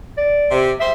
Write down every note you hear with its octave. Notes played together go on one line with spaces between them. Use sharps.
D5
C3
G3 G#3 C5 E5